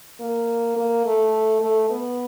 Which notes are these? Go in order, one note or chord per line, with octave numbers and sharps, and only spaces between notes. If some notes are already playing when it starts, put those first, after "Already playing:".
A#3
A#3
A3
A3
B3